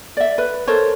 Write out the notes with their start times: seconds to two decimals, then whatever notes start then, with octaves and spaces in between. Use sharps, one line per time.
0.17 D5 E5
0.38 B4
0.67 A4 A#4 C5 C#5